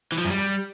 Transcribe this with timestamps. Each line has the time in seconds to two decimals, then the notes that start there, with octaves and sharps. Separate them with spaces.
0.12 E3
0.18 F3
0.24 F#2
0.30 G3